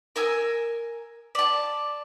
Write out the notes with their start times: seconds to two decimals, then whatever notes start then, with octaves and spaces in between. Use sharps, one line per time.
0.16 A#4 G#5 E6
1.35 D5 A5